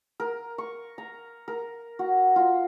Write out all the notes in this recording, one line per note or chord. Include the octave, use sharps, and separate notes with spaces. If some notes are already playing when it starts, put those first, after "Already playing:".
A#4
C#6
A#5
A#4
F#4
F4